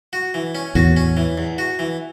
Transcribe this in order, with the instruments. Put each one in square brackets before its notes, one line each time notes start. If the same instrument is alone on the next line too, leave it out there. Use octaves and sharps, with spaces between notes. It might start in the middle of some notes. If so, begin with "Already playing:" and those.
[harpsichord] F#4
E3
C#4
[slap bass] E2 A2 [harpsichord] F#4
[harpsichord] C#4
E3
E2
F#4
E3